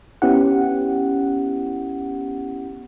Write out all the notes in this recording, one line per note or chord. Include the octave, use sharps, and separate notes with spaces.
B3 C#4 E4 G4 F#5